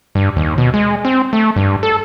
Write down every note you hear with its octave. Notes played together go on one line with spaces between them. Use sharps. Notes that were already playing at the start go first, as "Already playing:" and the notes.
G2
D#2
B2
G#3
C4
A3
G2
A4